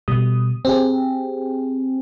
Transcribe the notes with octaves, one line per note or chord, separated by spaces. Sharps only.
B2 G3 D#6
C4 G4 G#4